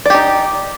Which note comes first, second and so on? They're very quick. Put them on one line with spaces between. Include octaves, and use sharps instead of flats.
D5 G4 D#4